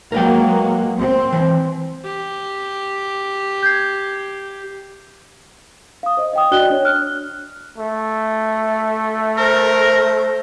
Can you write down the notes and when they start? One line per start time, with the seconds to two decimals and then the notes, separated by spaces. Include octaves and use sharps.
0.12 F#3 G#3 A#3 A#4 B4 G5
0.98 C4
1.32 E3 C5
2.05 G4
3.63 G6 G#6 C7
6.03 F5 D#6
6.17 C5 D#5
6.33 D#5 G5 D#6
6.51 D4 F#4 D5 G5 F#6 G7
6.70 D4 C#5
6.85 F6 F#6
7.78 A3
9.37 A#4 C5